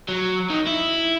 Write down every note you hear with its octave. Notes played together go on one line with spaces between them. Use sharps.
F#3
D#3
E4